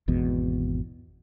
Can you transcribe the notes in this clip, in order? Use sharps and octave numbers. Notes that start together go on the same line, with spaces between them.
G#1 E2 B2